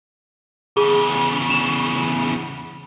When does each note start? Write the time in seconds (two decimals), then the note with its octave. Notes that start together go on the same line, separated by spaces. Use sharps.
0.77 E2 C#3 G#4
1.50 E7 F7